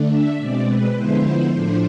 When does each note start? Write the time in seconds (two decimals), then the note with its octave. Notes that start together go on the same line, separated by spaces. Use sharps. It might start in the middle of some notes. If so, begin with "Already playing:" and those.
Already playing: D3 A3 D4
0.11 E5
0.39 B2 G#3 C4 D5
0.67 B4
0.96 D3 F3 G#3 B3 E4 C5
1.53 A2 F3 A3 D4